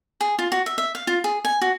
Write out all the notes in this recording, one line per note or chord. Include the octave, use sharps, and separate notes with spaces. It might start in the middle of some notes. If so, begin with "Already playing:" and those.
G#4
F4
F#4
E5
E5
F5
F4
G#4
G#5
F#4